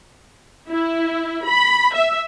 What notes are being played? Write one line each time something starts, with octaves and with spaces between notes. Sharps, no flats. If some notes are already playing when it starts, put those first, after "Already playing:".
E4
B5
E5